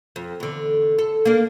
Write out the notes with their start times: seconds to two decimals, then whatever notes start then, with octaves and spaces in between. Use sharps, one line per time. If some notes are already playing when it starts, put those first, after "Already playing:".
0.16 F2
0.40 E2 D3
0.99 A4
1.25 A#3 D4